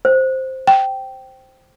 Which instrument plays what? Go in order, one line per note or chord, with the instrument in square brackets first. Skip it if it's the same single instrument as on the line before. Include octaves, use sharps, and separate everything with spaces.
[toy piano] C5
[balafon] G5